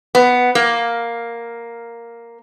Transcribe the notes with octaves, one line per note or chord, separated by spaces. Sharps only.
B3
A#3